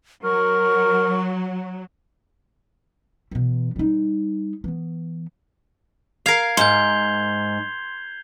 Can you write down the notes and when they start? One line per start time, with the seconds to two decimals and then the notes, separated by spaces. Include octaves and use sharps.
0.24 F#3 A#4 C#6
3.31 B2 E3
3.76 G3 D#4
4.64 E3 B3
6.26 A#4 F5 G#6 C7 F7
6.57 G#2 C6 G6 G7